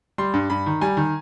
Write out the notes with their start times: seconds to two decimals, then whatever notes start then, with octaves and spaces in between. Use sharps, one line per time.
0.18 G3 C6
0.34 G2
0.50 G2 B5
0.66 D#3
0.81 G3 G#5
0.97 D#3